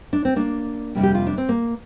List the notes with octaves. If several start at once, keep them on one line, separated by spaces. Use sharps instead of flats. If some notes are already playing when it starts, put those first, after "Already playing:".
D4
C4
A#3 D4
F2 C3 G3
G4
F4
D4
C4
A#3